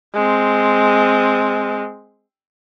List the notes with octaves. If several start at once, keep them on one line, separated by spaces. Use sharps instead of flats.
G#3 C4